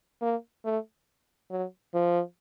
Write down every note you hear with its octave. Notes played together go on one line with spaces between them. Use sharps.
A#3
A3
F#3
F3